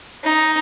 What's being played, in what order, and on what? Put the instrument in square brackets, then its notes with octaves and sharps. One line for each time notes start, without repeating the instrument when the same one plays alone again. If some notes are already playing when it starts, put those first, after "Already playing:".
[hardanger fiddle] D#4